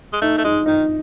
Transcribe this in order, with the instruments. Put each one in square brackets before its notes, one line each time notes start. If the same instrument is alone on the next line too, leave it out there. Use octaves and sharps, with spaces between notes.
[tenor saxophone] G#3
[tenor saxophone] A3 [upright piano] D#4
[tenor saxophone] A3
[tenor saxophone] G#3 [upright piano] D#4
[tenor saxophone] D#3 [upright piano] D#4